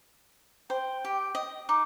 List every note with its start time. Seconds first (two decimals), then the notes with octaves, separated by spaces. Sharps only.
0.70 C5 G5
1.05 G4
1.35 D#5
1.69 D#4 D6